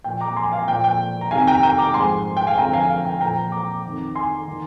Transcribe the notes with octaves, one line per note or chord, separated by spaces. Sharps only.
A#2 F3 G5
A#5 D6
G#5 C6
F5 G#5
A#2 F3 G5
G5
A#5
F2 C3 D#3 F5 G#5
G5 A#5
G5 A#5
A#5 D6
G#2 F3 G#5 C6
G5
F5 G#5
F2 D3 F3 G5 A#5
F5 G#5
F5
G5
A#2 F3 G5 A#5
A#5 D6
F2 D#3
G#5 C6
D#3